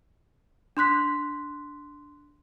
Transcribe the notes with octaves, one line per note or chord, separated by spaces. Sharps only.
D4 C6 F#6 B6